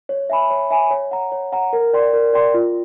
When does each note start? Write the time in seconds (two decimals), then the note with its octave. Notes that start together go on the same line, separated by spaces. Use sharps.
0.09 C#5
0.30 E5 G#5 B5
0.50 C#5
0.71 E5 G#5 B5
0.91 C#5
1.11 F#5 A#5
1.32 C#5
1.52 F#5 A#5
1.73 A#4
1.93 D5 G5 C6
2.13 A#4
2.33 D5 G5 C6
2.54 F4